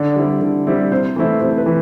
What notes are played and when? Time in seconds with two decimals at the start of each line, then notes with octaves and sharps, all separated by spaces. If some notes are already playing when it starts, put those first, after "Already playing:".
Already playing: D3 D5
0.16 G3 C4 E4
0.41 D3
0.67 G3 C4 E4
0.91 C3 C5
1.16 E3 A3 C4 E4
1.41 C3 C5
1.58 B4
1.66 E3